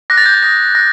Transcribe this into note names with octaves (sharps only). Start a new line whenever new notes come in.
D6 F#6 A#6
A6
G6
A6
D#6 G6 A#6
F#6 A#6